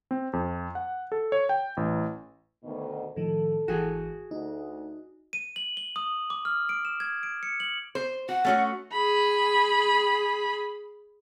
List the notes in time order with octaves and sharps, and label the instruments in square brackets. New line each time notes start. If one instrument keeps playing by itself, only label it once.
[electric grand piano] C4
F2
F#5
A4
C#5
G5
A1
[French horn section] D2 B2 D#3
[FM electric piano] A2 D#3 F3 [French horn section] A4
[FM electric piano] G#1 E3 [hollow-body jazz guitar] F#4 G#4
[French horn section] D2 [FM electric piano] D#4
[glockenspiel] D#7
F#7
G7
D#6
D6
F6
D7
E7
G#6
D7
C#7
F#7
[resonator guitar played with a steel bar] C5
[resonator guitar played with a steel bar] F#4 [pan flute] F#5
[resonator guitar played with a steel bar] A3 C#4 F#4
[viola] G#4 B5